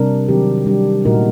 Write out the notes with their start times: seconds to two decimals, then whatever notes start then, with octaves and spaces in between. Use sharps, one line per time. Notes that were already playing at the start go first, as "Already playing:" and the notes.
Already playing: C3 G3 D4 A#4
0.28 D#3 F#3 C4 G4
0.66 G3 D4 G4
1.05 A#2 A3 D#4 F#4 A#4